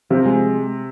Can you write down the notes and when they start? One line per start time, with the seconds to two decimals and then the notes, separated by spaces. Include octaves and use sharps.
0.10 C3 F3
0.26 G#3